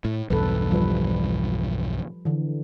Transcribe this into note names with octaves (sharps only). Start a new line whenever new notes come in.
A2
B1 E2 G2 A4 B4
F3 G3 B4
D3 E3